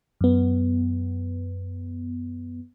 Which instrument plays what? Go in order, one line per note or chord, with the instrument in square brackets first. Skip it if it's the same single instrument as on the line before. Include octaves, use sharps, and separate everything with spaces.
[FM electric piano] F#2 B3